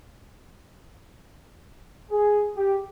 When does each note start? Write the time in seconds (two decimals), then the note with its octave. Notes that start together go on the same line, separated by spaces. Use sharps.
2.11 G#4
2.57 G4